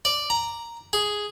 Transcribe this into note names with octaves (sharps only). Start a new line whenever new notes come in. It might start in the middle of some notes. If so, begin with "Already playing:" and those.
D5
A#5
G#4